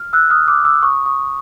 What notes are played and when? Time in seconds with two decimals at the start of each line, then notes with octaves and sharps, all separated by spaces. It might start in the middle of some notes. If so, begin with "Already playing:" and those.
Already playing: F6
0.13 E6 F#6
0.30 D#6 F6
0.48 D6 E6
0.65 D6 E6
0.83 C#6 D#6
1.06 C#6 D#6